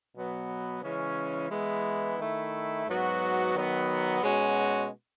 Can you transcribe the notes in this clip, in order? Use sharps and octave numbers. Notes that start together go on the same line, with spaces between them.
B2 F#3 B3
C#3 E3 G#3 C#4
E3 G#3 B3 E4
D#3 A3 E4
G#2 F#3 B3 F#4
D#3 F#3 B3
B2 G#3 C#4 F#4